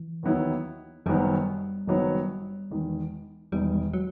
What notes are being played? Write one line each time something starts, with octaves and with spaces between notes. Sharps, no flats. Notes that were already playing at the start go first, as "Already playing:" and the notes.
Already playing: E3
D#2 D#3 F#3 B3 E4
F#1 F#2 D#3 F#3 G3 B3
F#1 F#2 D#3 F#3 B3
E1 E2 D#3
E1 E2 D#3 G3
F#3